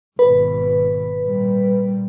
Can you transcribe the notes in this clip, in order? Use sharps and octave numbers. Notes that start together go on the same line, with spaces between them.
G#1 B2 B4
A#2 G3